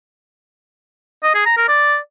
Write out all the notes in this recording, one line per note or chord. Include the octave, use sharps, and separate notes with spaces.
D#5
G#4
A#5
A#4
D5